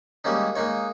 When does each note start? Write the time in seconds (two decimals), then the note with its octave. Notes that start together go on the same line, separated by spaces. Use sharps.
0.24 G3 G#3 A#3 C#4 D#4
0.55 G#3 A#3 D#4 C#5